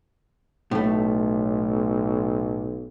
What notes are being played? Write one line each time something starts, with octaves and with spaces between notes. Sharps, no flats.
B1 A2 A3